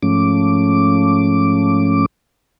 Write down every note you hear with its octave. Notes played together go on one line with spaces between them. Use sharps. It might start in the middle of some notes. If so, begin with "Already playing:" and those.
G#2 F3 A3 C#4 D6